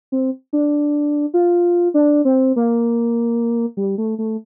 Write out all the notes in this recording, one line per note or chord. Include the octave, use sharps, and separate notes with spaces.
C4
D4
F4
D4
C4
A#3
G3
A3
A3